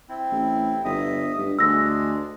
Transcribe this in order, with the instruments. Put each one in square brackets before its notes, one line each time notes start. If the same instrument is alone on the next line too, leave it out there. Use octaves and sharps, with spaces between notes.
[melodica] C4 E4
[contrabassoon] A1
[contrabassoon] G1 [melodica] D#5 E5 D#6
[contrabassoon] G2
[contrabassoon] D2 [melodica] G#3 D4 G#4 [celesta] E6 A#6